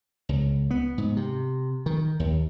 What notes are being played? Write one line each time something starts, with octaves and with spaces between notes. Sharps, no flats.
C#2
B3
G#2
C3
D#3
D#2